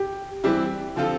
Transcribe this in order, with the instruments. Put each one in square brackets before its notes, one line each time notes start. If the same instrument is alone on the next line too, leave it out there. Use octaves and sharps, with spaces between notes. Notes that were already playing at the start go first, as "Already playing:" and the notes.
Already playing: [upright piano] G4
[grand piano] E3 G3 C4 E4 [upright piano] G4
[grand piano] D3 F3 C4 F4 A4